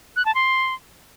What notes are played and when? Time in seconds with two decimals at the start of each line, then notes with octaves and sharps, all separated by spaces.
0.16 F#6
0.26 A5
0.35 C6